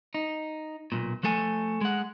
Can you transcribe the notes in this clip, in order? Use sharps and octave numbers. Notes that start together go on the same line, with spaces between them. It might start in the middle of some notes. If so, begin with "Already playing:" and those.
D#4
B1 A#2
F3 A3 A4 G#5
G#3 F#5